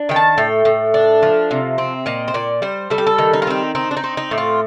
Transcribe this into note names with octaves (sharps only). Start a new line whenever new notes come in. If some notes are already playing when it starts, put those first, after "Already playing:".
Already playing: D4
D#3 G5
A5
A2 G5
A2
D4
F3
C3
C4
A#2 D#5
C5
A#2 D5
G3 C5
G3 A4
G4
A4
D#3
D#4
F4
C4 D#4
C4 D#4
D4
D#4
C4
D#4
A2
F4